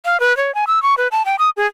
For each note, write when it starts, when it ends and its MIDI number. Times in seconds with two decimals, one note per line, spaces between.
0.05 0.20 77
0.20 0.35 71
0.37 0.54 73
0.55 0.65 80
0.67 0.82 88
0.83 0.95 85
0.98 1.08 71
1.12 1.25 81
1.25 1.36 79
1.39 1.50 87
1.57 1.66 68